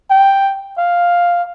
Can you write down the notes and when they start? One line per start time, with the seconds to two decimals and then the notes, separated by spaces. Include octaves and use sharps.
0.10 G5
0.78 F5